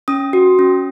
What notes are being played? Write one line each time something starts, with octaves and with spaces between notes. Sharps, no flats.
C#4 D#6
F#4
C#4